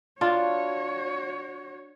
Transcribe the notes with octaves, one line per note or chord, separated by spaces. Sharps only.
D4 F4 F#4 C#5